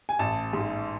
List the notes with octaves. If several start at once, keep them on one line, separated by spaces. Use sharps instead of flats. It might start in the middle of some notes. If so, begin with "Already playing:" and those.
G#5
A1 A5
G#2